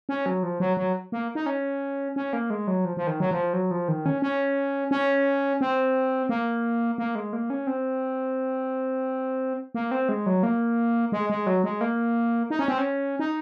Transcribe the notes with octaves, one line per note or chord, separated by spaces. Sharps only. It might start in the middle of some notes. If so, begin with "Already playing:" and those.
C#4
F#3
F3
F#3
F#3
A#3
D#4
C#4
C#4
A#3
G#3
F#3
F3
F3
D#3
F#3
F3
F#3
F3
D#3
C#4
C#4
C#4
C4
A#3
A#3
G#3
A#3
C#4
C4
A#3
C4
G#3
F#3
A#3
G#3
G#3
F#3
G#3
A#3
D#4
C#4
C4
C#4
D#4